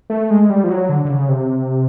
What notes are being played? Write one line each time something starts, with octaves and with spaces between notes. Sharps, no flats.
A3
G#3
G3
F3
F#3
D3
D3
C#3
C3